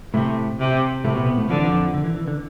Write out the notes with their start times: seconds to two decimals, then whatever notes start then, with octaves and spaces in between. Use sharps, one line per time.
0.14 A2 C3 A3
0.60 C3
1.04 A2 C3 A3
1.15 B2 B3
1.26 B2 B3
1.37 A2 A3
1.48 D3 F3
1.56 E3
1.65 F2 F3
1.94 D3
2.04 E3
2.16 E3
2.28 D3